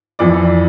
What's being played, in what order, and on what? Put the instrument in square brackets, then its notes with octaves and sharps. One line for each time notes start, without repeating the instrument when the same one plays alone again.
[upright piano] F2 E3 D5